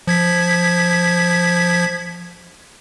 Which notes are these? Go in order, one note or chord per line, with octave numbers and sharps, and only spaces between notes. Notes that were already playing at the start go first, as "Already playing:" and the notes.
F3 G#6 B6